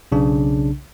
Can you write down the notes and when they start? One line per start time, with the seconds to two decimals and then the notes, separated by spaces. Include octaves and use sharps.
0.12 B1 C#3 D4